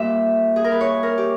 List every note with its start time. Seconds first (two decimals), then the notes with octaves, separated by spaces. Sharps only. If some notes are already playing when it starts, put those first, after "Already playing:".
Already playing: A#2 G3 E5
0.56 G#4
0.64 A#4
0.72 B4
0.81 C#5
1.03 A#4
1.18 G4